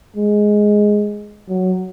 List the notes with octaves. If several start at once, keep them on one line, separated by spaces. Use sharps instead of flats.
G#3
F#3